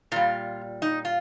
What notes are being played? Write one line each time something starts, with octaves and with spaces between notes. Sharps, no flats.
A#2 G3 F4
D#4
F4